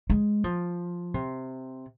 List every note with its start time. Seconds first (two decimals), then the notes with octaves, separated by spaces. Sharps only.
0.10 G#3
0.44 F3
1.14 C3